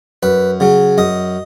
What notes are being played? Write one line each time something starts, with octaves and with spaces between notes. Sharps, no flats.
F#2 B4
C#3 F#3
F#2 D#5